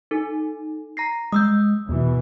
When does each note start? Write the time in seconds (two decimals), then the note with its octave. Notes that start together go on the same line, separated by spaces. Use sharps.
0.11 D#4 A4
0.97 A#5 A#6 C7
1.32 G#3 D#6 E6 G6
1.89 E2 B2 E3